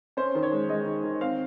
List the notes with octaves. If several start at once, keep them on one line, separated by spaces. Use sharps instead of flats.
C#4 C5
D#3
C#5
G#3
G#3 D#5
D#3
D#3
C4 F5